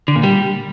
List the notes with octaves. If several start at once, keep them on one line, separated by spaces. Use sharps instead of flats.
D3
A#2
G3